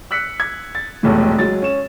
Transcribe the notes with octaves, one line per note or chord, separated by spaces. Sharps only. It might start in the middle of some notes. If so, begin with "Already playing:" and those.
E6 F#6 B6 C#7
G#6
A6
F1 B1 A2 E3 G#3 A3
F#3 G#3 A6
C#4 E7